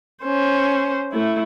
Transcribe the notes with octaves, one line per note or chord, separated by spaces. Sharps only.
C#4 C5
A3 E4